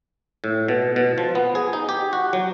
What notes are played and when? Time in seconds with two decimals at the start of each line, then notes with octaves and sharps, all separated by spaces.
0.44 A2
0.68 B2
0.96 B2
1.18 F3
1.35 B3
1.55 G#4
1.73 D#4
1.89 G4
2.13 F#4
2.33 F#3